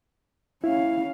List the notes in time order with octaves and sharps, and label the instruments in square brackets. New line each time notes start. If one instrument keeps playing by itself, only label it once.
[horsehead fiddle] C#4 F5 [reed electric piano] E4